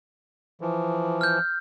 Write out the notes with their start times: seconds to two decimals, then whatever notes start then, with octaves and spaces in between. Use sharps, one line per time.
0.61 E3 F3
1.21 F6 G6